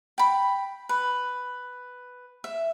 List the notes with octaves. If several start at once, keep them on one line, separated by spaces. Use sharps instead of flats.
G5 B5
B4
E5